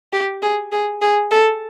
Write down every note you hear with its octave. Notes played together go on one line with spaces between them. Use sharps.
G4
G#4
G#4
G#4
A4